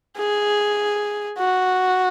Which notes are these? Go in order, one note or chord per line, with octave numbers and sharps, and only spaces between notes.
G#4
F#4